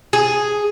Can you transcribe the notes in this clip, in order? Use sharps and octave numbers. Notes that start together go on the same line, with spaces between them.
G#4